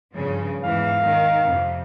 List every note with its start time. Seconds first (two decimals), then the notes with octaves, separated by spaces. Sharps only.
0.15 G2 C#3 F3
0.63 E2 G#2 E3 F5
1.03 D#3
1.46 F2 C3